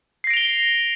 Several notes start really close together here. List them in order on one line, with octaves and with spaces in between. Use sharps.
C7 A#6 D7 F7 G7